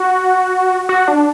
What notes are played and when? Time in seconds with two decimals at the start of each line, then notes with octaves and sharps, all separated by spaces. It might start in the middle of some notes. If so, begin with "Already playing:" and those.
Already playing: F#4
0.89 F#4
1.08 D4